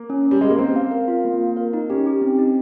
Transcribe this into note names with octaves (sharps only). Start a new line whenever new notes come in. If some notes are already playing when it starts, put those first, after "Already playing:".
Already playing: A#3
C#4
G3 C#5
G#3 C#4
A#3
C4 A#4
F5
A#4
F4
A#3
A#3
A#4
D#4
C#4 G4
G4
C4
D#4